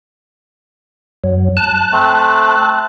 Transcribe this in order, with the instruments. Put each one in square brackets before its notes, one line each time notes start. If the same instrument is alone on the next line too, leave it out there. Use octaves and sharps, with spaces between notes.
[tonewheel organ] F#2 F#3
A5 F#6
[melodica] A3 C4